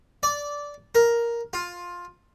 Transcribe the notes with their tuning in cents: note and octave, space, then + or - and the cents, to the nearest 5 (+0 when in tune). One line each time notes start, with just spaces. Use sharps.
D5 -10
A#4 +5
F4 +10